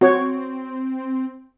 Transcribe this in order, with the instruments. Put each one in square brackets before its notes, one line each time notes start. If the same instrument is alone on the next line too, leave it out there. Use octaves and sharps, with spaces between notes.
[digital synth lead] C4 [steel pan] F#4 C#5